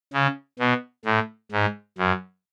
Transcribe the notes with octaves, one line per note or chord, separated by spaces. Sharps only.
C#3
B2
A2
G#2
F#2